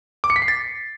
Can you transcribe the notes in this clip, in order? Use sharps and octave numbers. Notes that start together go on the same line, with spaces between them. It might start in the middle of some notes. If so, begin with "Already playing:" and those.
D6
C#7
B6
C7
A6